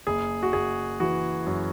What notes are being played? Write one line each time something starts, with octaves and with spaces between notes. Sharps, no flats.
F#1 G#4
F#4
F#1 G#4
E3 F#4
F#2